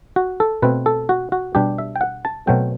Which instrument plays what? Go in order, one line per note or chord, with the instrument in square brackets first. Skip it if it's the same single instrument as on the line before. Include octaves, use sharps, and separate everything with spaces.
[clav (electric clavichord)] F#4
A4
B2 A3 C4 B4
A4
F#4
F#4
B2 G3 D4 G4
E5
G5
F#5
A5
B2 F#3 A3 C4 G5